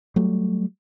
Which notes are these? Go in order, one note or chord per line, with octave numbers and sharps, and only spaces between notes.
F#3 G3 A3